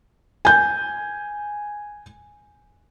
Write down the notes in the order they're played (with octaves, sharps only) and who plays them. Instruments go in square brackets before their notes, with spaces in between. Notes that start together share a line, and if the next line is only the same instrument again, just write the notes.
[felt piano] G#5 G6